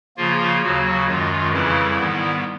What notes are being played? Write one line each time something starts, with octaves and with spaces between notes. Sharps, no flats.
C#3 F3 A#3 F4
D#2 C#3 F#3 F#4
F#2 D#3 G#3 F4
F2 C#3 E3 G3 E4
G#2 D#3 G3 B3